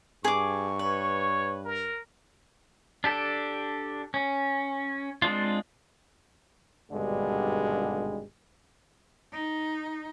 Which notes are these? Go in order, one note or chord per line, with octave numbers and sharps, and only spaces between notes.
G2 G#4 C#6 D6
B4 C#5
A#4
D4 G4 A4
C#4
G#3 C4 D4 F4
G#1 G2 B2 D3 G3 G#3
D#4